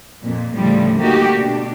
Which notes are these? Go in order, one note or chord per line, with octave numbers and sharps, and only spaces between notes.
F2 A#2 A#3
D2 A2 C#3 F3 G3 A3
A3 A#3 D#4 F#4 G4
B2 D4